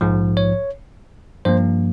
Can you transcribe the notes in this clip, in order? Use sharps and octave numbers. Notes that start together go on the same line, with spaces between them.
A#1 G#2 F3
C#5
G2 F3 A#3 C5